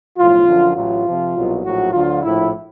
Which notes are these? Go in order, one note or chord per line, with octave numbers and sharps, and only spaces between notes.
B1 A2 F3 F4
F#2 D3 F3
A1 A2 F#3 F4
F2 C3 F3
C2 B2 F#3
A#1 A2 F#3 F#4
D2 D3 F#3 F4
A#1 A2 F3 E4